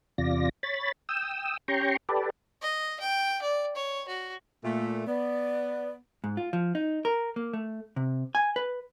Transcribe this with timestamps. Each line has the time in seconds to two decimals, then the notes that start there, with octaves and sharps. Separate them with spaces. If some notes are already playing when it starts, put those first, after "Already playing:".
0.18 E2 C3 F4 D5 A#6
0.63 C#5 B5 A6
1.09 G5 D#6 E6
1.68 C#4 G4 G5 A#5 C6 C#6
2.09 G4 A4 B4 D5
2.62 D#5
3.00 G5
3.42 D5
3.76 C#5
4.08 F#4
4.65 A#2 A3
5.07 B3 D5
6.24 G#2
6.37 F4
6.53 F3
6.75 D#4
7.05 A#4
7.36 A#3
7.53 A3
7.96 C3
8.35 G#5
8.56 B4